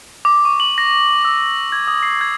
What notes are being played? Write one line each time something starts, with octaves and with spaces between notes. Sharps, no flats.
D6
C#6
F#7
A#6
E6
G#6
D#6
C7
G#6